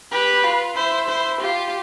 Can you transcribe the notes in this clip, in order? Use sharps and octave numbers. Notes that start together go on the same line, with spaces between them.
G4 B4
F4
E4 C5
C5
F4 G4